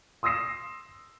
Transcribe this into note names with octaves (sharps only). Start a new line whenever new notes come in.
C6 D#6 E6 A#6 C7 E7